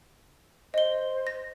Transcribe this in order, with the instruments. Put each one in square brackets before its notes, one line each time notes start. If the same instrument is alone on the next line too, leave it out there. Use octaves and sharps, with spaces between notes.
[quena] C5 [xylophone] D#5 G7
[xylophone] A#6